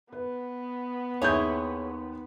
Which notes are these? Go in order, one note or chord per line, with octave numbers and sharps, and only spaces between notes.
B3 B4
D#2 E4 G#4 C#5 G6